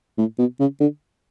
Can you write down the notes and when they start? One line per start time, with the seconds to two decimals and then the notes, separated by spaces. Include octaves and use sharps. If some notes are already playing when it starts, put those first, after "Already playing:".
0.18 A2
0.39 B2
0.60 C#3
0.80 D3